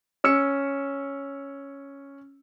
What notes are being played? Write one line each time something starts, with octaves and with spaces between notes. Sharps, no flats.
C#4 E6 C#7